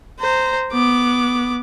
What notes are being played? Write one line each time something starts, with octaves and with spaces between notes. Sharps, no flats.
C5 A#5
B3 D6